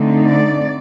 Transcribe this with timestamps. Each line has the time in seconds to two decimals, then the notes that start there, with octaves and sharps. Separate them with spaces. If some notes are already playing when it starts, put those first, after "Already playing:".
Already playing: D3 A3 C4 D#4
0.23 D5